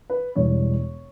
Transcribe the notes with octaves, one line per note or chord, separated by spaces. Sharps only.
B4
E1 E2 B2 G3 C#5